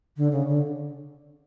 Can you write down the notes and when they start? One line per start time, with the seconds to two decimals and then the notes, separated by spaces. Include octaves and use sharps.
0.17 D3
0.32 C#3
0.48 D3